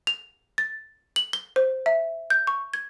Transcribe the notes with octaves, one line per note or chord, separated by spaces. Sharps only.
F7
A6
F#7
G7
C5
E5
G6
C#6
G#6